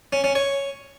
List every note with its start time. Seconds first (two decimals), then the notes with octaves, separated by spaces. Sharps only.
0.13 C#4
0.24 C#4
0.35 C#5